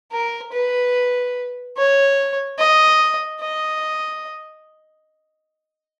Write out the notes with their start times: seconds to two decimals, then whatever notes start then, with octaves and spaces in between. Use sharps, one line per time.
0.12 A#4
0.53 B4
1.77 C#5
2.59 D#5
3.41 D#5